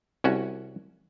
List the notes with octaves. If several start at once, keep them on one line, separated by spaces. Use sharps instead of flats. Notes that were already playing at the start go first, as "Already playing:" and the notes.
C2 C#4 F#4